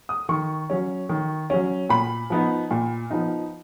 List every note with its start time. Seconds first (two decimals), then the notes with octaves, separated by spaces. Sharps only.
0.09 D#6
0.29 D#3 C#6
0.70 F#3 C#4
1.09 D#3
1.50 F#3 C#4
1.89 A#2 B5
2.30 F3 B3 D#4
2.71 A#2
3.10 F3 B3 D#4